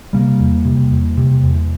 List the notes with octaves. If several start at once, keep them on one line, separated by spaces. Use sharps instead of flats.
C3 G3 A#3
E2
C3
E2
C3
E2